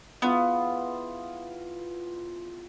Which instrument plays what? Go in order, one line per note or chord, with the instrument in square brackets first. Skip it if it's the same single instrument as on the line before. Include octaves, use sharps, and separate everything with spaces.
[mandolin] B3 [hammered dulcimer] E4 F4 G#4